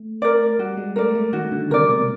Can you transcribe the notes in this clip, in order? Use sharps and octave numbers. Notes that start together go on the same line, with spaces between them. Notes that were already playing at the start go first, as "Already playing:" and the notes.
Already playing: A3
A#4 D5
G3 F#4
G#3
A3 A#4 D5
A3
D#3 F#4
D3
C3 A#4 D5
B2